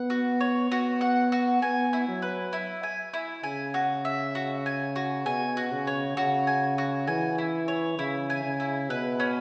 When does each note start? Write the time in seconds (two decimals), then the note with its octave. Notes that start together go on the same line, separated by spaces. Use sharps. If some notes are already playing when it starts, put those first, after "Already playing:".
Already playing: B3 F#5
0.10 F#4
0.41 C#5
0.71 B3 F#4
1.01 F#5
1.32 F#4
1.62 B3 G#5
1.93 E4
2.08 F#3
2.22 B4
2.53 E4
2.83 G#5
3.14 E4
3.43 C#3 G#5
3.74 F#4
4.05 E5
4.35 F#4
4.66 G#5
4.96 F#4
5.25 B2 G#5
5.57 F#4
5.72 C#3
5.87 C#5
6.17 C#3 F#4
6.47 G#5
6.78 F#4
7.07 E3 G#5
7.38 E4
7.68 C#5
7.98 C#3 E4
8.30 G#5
8.44 C#3
8.60 E4
8.89 B2 B4
9.20 C#4